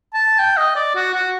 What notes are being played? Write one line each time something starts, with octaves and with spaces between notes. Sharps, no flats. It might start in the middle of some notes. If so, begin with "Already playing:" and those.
A5
G5
D#5
D5
F#4
F#4